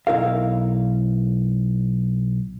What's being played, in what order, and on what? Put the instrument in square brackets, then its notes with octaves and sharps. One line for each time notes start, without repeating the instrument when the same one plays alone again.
[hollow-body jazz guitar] B1 E4 A#4 F5